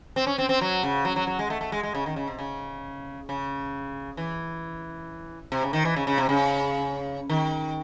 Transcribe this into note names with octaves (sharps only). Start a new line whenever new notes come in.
C4
C#4
C4
C4
F#3
C#3
F#3
F#3
F#3
G#3
A3
A3
G#3
G#3
C#3
D#3
C#3
C3
C#3
C#3
E3
C3
C#3
D#3
E3
C#3
C#3
C3
C#3
D#3